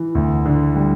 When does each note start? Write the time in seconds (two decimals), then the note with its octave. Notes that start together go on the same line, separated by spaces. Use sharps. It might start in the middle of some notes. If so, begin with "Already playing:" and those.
Already playing: E3
0.15 D2
0.46 D3
0.76 G3